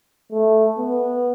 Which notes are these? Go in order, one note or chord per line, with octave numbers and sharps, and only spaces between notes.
A3
B3